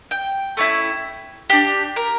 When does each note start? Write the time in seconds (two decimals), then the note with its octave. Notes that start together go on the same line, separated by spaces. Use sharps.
0.11 G5
0.57 A3 C#4 E4
1.50 D4 G4
1.96 A#4